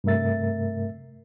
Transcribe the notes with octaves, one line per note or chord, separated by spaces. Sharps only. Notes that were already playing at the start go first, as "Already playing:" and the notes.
G2 C3 A3 A#4 E5 A6